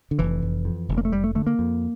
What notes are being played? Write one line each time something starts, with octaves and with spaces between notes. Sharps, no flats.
D3
F1 E3
F1
F2
F1
A#3
A3
F1 G3
A3
D3 A3
A#3
F2